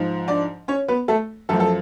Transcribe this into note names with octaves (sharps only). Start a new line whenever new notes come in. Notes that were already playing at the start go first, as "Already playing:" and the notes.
Already playing: G#2 F3
D4 D5
C#4 C#5
B3 B4
A3 A4
F#2 F3 A3 A4
A4